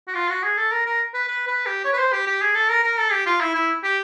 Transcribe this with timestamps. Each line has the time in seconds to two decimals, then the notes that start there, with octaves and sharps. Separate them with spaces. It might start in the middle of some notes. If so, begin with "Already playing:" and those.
0.08 F#4
0.15 F4
0.30 F#4
0.43 G#4
0.57 A4
0.72 A#4
0.86 A#4
1.14 B4
1.28 B4
1.47 B4
1.66 G4
1.85 C#5
1.93 B4
1.99 C5
2.13 G4
2.27 G4
2.42 G#4
2.55 A4
2.70 A#4
2.84 A#4
2.99 A4
3.12 G4
3.26 F4
3.41 E4
3.55 E4
3.84 G4